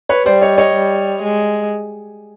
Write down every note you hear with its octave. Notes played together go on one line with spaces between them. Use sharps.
B4 C#5
G3 C5 D5
C#5 D#5
C#5 D#5
G3
G#3